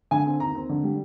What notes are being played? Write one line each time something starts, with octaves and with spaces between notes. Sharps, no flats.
D3 G#5
C4
D#2 A#5
C4
D3
G3